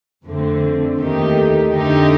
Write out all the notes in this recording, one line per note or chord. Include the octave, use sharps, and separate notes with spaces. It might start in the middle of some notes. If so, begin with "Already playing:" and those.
F2 D3 A3 C4
D#2 D#3 A3 D#4 G4
F2 D3 A3 D#4 G4